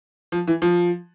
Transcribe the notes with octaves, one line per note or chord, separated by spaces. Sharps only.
F3
E3
F3